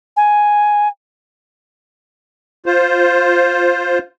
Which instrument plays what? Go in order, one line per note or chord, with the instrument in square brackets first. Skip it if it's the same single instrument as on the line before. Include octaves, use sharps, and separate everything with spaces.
[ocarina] G#5
[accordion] F4 C5